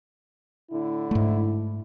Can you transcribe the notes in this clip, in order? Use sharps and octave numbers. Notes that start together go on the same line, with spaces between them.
A2 D3 E4
G#2 A3